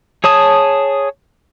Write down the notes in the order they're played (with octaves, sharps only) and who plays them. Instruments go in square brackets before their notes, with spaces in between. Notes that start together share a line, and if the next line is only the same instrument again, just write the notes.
[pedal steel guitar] G#4 C#5 A5 D#6